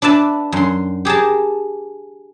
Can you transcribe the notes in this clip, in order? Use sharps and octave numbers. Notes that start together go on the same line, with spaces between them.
D4 B4 E5 A5 B5
F#2 C6
G4 G#4 A#4 A5